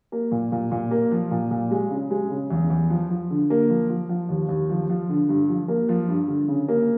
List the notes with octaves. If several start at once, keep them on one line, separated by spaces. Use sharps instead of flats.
A#3
A#2
A#2
A#2
A#3
F3
A#2
A#2
G#3
C#3
G#3
C#3
E2
E2
F3
F3
D3
A#3
F3
F3
F3
D#2
D#2
F3
F3
D3
G2
F3
A#3
F3
G2
D3
C#3
A#3